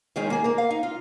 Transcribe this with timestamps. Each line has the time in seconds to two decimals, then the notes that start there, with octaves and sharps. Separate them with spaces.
0.16 D#3 G#3 C#4 D#4 F4 G#4
0.30 A#3 G#4
0.44 A#3 A#4
0.58 F5
0.71 D#4
0.83 F4